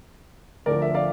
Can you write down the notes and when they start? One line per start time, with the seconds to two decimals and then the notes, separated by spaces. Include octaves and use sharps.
0.66 D2 D3 F3 A#4 D5
0.82 E5
0.94 D5 F5